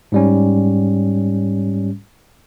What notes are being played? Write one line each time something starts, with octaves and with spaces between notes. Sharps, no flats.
G#2 G3 C#4